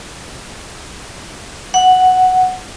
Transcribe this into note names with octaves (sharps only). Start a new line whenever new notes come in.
F#5